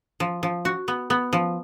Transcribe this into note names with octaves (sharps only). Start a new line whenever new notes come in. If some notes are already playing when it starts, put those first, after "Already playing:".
F3
F3
F#4
B3
B3
F3